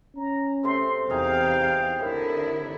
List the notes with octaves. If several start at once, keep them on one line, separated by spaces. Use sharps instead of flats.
C#4 A#5
C3 A3 C4 C6
E2 C3 D#4 G#4 A#4 F5 G5
A2 D3 E4 A#4